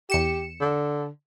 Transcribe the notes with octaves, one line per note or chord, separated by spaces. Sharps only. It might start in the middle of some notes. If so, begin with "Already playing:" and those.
E2 G4 C#7 E7
D3